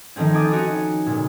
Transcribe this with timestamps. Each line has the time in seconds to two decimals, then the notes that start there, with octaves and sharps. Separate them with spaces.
0.16 D#3 F3 A3 C4 C#4
0.33 G#5 D6 D#6 A6
0.52 C#4 D#4 F#4
1.06 A#2 C#3